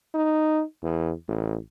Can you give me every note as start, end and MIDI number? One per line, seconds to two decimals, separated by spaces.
0.14 0.62 63
0.83 1.12 40
1.28 1.56 33